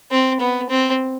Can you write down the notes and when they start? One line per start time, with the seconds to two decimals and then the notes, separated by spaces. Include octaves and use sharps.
0.11 C4
0.40 B3
0.70 C4